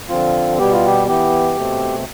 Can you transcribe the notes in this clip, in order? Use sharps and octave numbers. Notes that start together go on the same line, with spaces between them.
D3 F3 C4 F4
B2 G3 B3 G4
F4
G4
E3 B3 G4
B2 A3 C4